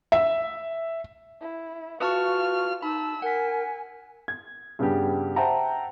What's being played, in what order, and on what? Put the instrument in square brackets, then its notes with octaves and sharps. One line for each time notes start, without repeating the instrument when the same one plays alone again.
[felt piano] E5
[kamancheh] E4
[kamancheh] F4 F6 [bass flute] F#4 [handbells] B4 A5 C#6
[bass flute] D#4 [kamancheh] A5 E6 [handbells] B5
[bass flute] A#4 [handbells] F#5 B6 [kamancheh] G#5
[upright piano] G#6
G2 C#3 B3 D4 G4
C5 E5 F#5 G5 A5 A#5